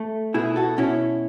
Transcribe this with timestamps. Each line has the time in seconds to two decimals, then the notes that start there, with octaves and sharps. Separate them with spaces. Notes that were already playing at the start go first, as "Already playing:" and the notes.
Already playing: A3
0.34 B2 E4 G#4
0.56 F#4 A4
0.78 B2 C#4 E4